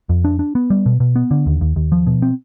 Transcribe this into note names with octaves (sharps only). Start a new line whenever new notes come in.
F2
D4
D4
B3
G3
B2
B2
B3
D3
D#2
D#2
D#2
F3
B2
C4